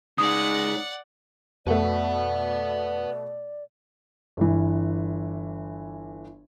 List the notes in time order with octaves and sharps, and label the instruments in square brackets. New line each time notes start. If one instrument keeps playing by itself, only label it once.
[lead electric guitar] C#3 G#3 [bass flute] D#4 [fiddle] D5 F#5 [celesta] D#6
[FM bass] F2 [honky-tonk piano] B2 A3 [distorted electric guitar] B4 F#5 [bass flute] D5
[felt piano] G1 E3